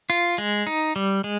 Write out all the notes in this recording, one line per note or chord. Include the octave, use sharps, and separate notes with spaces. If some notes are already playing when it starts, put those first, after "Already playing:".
F4
G#3
D#4
G3
G#3